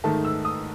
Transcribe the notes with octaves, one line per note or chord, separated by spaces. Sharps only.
G#2 D#3 A3 A5
E6
D#6